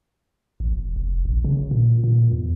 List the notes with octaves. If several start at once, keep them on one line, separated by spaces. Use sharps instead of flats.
A1
E1
F1
A#1
C#3
A#2
A#2
E2